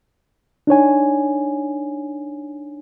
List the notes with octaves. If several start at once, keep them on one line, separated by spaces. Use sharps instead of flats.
D4 D#4 C#5 G#5